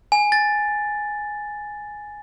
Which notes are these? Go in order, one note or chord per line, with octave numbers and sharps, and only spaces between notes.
G#5
A6